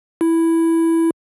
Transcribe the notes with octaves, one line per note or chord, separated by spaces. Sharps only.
E4